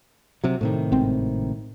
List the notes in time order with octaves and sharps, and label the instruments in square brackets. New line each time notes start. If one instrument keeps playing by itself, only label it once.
[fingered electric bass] C3 F#3
A2 C3 D#3
[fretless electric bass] G#1 C4